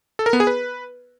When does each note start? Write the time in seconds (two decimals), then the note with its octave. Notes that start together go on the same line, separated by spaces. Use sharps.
0.19 A4
0.26 A#4
0.33 B3
0.40 G#4
0.47 B4